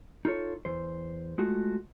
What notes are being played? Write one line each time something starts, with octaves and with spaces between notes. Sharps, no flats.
D#4 F4 A4 C#5
E2 C5
G#3 A3 F4 F#4